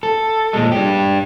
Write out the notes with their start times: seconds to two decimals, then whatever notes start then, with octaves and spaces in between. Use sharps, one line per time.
0.03 A4
0.53 A#2 G#3
0.72 D4 G4